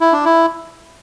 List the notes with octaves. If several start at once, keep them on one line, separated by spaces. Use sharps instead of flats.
E4
D4
E4